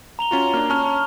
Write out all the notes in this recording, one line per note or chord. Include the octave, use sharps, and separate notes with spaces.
A#5 F7 G7
C#4 F4 F#4
A#3 D4 F6
C#4 A5 C#6 F6